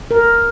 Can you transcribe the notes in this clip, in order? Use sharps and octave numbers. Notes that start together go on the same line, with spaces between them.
A#4